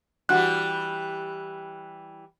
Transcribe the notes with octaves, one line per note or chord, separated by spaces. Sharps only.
E3 G3 D4 F#4 F#5 F#6